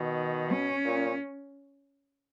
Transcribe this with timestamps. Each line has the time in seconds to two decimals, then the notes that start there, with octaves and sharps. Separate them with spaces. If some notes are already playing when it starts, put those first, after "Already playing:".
Already playing: B2 D#3
0.52 C#4
0.85 A#2